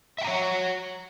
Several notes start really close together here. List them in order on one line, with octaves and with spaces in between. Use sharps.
E5 G5 A#5 C#5 F#5